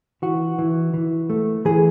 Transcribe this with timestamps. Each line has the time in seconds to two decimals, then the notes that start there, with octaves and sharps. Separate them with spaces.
0.22 E3 F#4
0.58 E3
0.94 E3
1.30 A3
1.65 E3 G#4